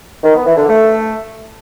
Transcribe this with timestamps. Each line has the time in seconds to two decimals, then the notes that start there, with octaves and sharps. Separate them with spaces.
0.24 D#3
0.35 B3
0.46 E3
0.57 D3
0.68 A3